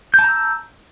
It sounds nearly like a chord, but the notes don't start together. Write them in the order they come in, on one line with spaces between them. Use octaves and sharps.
G6 A5 A#5 E6